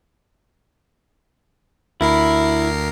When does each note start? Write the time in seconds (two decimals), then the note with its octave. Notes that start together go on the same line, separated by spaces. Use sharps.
2.01 D2 E4 A#4 C7